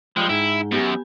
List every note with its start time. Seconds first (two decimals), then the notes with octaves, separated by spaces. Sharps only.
0.17 F3 G3 G#3 G5
0.29 G#2 E4
0.72 F#2 B3 G4 G#5